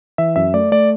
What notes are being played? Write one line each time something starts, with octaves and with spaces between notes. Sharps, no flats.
E3 E5
F#2 E5
A3 D5
A3 D5